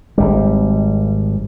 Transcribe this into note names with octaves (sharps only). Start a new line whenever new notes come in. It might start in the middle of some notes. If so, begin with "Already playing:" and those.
G#1 G3